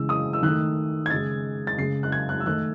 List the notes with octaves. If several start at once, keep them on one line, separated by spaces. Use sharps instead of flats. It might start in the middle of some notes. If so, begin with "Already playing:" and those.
Already playing: C#3 E3 G#3 E6
D#6
E6
D#3 A3 F#6
G#6
C#3 G#3 A6
A6
C#3 G#3 C7
F#6
G#6
F#6
E6
D#3 A3 F#6